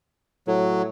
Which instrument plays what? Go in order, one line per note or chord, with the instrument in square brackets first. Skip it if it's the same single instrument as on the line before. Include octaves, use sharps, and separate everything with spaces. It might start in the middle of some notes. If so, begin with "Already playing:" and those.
[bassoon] A2 [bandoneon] F#3